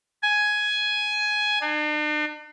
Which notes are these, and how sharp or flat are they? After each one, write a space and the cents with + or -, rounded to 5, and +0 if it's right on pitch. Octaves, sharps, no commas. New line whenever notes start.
G#5 +10
D4 +45